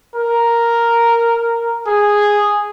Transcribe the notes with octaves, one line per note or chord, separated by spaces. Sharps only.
A#4
G#4